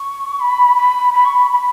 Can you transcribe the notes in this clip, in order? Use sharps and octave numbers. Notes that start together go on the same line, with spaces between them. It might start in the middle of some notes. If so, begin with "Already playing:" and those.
Already playing: C#6
B5
B5
B5
C#6
B5
B5